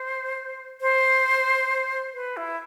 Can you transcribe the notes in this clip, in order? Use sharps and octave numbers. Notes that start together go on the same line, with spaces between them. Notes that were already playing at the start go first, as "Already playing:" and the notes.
Already playing: C5
C5
B4
E4